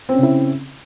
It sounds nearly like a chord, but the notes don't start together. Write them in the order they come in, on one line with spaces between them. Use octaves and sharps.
C4 C#4 C#3 E4